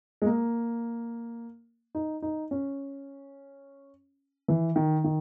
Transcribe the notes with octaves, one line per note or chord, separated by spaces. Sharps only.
G#3
A#3
D#4
D#4
C#4
E3
D#3
D#3